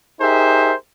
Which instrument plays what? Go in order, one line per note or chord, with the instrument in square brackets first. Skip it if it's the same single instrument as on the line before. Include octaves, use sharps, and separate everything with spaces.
[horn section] D#4 G4 G#4 A#4 C5 E5